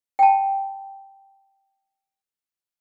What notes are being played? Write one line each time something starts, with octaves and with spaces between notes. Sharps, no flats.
G5 A5